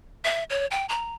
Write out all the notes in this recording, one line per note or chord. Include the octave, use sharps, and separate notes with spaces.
E5
C#5
G5
A#5